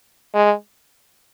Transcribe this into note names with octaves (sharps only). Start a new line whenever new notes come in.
G#3